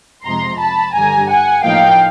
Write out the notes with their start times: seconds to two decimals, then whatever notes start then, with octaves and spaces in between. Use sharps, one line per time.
0.24 F2 C3 F3 G#3 A#5 C6
0.59 A5 B5
0.94 G2 D3 G3 G#5 A#5
1.29 F#5 G#5
1.63 A2 F3 A#3 D#4 F5 G5